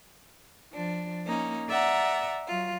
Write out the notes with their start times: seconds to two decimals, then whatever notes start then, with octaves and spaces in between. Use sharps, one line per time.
0.72 F3 D4
1.26 A#3 C#4 D#4
1.68 D5 E5 F#5 A#5
2.46 F#3 F4